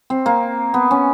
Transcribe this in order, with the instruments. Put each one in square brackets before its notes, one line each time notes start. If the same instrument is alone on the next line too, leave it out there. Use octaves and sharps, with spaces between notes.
[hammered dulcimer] C4
A#3
B3
C#4